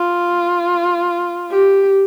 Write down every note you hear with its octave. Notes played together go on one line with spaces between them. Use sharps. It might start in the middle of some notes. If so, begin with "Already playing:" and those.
Already playing: F4
G4